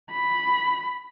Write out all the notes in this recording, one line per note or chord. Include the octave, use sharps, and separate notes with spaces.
B5